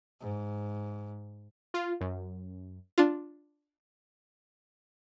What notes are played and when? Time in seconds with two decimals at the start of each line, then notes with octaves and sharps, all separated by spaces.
0.21 G#2
1.74 F4
2.01 F#2
2.98 D4 F4